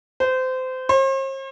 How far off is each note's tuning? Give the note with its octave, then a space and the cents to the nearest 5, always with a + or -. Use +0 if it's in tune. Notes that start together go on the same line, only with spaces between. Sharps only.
C5 -25
C5 +45